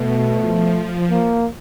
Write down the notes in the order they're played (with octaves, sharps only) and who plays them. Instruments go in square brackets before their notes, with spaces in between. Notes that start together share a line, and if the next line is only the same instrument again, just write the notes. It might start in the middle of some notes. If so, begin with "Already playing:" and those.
Already playing: [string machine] B2 [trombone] A3
[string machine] F3
[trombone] A#3